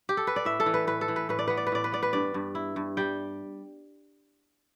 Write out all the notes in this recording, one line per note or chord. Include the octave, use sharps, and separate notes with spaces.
G4
A4
B4
D5
A2 E5
A4
E3
B4
A2 B4
A4
E3
B4
A2 B4
D5
B3 B4
D5
B4
A2 D5
B4
B3 D5
B4
G2 D5
G2
E4
G2
G3 G5